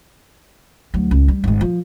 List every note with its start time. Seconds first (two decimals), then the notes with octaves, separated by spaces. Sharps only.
0.94 D2 F#3
1.11 C#2
1.28 G3
1.44 G#1 G#2
1.61 F3